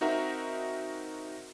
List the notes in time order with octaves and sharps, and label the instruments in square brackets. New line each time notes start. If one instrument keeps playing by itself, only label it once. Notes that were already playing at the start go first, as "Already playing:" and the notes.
[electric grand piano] C4 D#4 F#4 A#4 E5 A#5